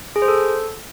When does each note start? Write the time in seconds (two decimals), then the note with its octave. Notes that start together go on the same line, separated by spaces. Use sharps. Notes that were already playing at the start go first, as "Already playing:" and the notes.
0.16 G#4
0.22 C5
0.28 A4